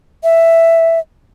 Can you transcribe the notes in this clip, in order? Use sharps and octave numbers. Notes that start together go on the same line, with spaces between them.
E5